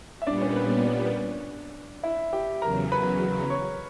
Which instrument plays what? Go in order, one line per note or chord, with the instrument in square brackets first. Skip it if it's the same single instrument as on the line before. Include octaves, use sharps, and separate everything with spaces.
[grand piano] E5
[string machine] A#2 G3 B3 [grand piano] D4 D5
[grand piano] C#4 C#5
B4
B4
D4 D5
E4 E5
G4 G5
[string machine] E2 C#3 F#3 [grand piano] A#4 A#5
[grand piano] B4 B5
C#5 C#6